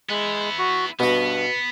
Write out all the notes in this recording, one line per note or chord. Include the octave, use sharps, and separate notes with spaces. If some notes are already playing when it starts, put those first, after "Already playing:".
G#3 B3 E4
F#4
G2 B2 B3 F#4